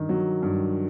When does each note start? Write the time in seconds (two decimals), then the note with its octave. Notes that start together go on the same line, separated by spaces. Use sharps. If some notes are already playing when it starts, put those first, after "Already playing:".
Already playing: G2 D#3
0.09 F#3
0.43 G2